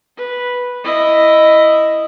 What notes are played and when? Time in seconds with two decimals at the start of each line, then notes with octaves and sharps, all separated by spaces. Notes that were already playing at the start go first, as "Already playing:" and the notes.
0.17 B4
0.84 E4 D#5